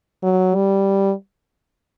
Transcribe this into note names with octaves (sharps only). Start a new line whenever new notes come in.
F#3
G3